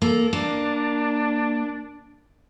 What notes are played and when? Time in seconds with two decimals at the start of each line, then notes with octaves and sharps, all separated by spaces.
0.02 A#3 A4
0.33 A#3 D4